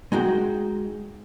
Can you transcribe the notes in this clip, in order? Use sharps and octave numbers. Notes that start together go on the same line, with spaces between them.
G#3 D#4 F#4 G5